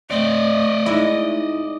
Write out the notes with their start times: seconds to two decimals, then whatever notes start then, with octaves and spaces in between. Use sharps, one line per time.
0.10 A3 C4 D5 D#5
0.86 G#3 D#4 E4